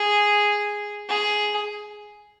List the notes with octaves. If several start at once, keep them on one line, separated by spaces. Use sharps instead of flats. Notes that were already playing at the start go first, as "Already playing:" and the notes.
Already playing: G#4
G#4